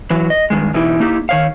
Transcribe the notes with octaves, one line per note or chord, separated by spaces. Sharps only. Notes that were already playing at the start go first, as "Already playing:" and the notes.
E3 F#3
D#5
G2 D#3 G#3
B2 E3 D#4 E4 G4
A#3 D#4 E4 G4
D#3 C#5 F5